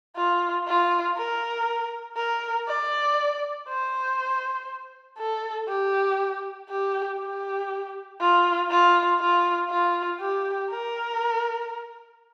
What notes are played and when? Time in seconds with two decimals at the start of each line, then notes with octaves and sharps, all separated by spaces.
0.16 F4
0.67 F4
1.17 A#4
2.17 A#4
2.68 D5
3.68 C5
5.18 A4
5.68 G4
6.69 G4
7.19 G4
8.20 F4
8.71 F4
9.20 F4
9.70 F4
10.21 G4
10.70 A#4